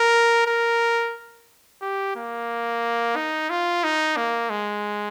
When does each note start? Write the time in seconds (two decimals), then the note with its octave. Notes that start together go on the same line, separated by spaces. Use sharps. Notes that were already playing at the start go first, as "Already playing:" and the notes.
Already playing: A#4
0.47 A#4
1.82 G4
2.16 A#3
3.16 D#4
3.50 F4
3.84 D#4
4.17 A#3
4.50 G#3